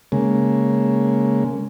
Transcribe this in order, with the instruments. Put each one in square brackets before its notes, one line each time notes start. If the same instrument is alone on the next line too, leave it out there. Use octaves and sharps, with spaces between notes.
[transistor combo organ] C#3 G#3 A#3